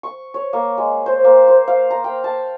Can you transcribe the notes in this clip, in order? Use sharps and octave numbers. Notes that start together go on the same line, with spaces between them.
C#6
C#5
A#3
G#3
C5
A#3
C5
F5
A#5
G5
A5